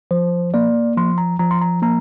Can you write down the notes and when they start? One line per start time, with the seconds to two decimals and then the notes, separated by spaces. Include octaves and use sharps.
0.11 F3 C5
0.54 A#3 D5
0.97 F3 C6
1.18 A#5
1.39 F3 A#5
1.51 C6
1.61 A#5
1.82 A#3 A#5